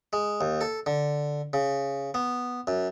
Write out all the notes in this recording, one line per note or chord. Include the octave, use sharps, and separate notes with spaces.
G#3
D#2
A4
D3
C#3
B3
F#2